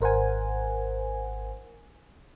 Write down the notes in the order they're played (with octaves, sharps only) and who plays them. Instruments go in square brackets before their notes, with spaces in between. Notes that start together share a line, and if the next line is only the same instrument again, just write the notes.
[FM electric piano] G#1 A#4 C5 F#5 G#5